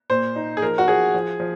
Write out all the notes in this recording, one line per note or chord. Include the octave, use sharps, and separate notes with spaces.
A#2 C5
D#4
G#4
F3 A#4
F#4
F3 G#4
F3
F3